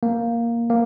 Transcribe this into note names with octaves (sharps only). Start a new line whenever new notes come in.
A#3
A#3